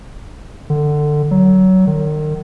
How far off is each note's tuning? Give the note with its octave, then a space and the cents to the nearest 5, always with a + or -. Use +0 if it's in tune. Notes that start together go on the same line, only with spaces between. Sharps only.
D3 +20
F#3 +20
D#3 -35